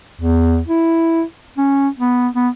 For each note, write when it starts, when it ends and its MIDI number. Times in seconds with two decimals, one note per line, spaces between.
0.21 0.61 40
0.68 1.23 64
1.58 1.88 61
1.99 2.28 59
2.35 2.49 59